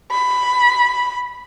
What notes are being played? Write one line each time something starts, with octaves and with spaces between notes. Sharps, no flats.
B5